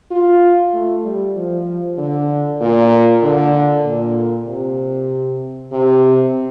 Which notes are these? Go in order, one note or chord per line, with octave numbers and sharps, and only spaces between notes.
F4
A3
G3
F3
D3
A#2
D3
A#2
C3
C3